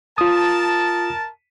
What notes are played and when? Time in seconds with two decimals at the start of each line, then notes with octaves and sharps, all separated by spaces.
0.18 F4 A#4 A5 D#6